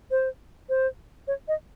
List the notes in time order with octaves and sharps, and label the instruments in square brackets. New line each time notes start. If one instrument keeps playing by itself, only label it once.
[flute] C5
C5
C#5
D#5